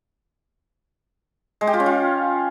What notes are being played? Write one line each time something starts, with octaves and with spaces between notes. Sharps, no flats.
G#3
G4
F4
C#4
F4